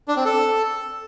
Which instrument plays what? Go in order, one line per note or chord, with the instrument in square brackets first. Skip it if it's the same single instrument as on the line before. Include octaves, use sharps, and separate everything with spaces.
[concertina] D4
C4
A4